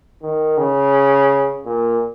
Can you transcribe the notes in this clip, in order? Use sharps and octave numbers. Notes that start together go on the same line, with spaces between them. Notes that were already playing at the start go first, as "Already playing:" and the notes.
D#3
C#3
A#2